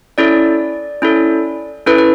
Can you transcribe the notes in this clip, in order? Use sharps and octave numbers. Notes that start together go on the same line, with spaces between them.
C#4 E4 A4 D5
C#4 E4 A4
C#4 E4 A4 B4
B4